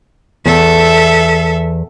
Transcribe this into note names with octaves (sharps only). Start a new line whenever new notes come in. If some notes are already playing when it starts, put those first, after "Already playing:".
E2 A4 E5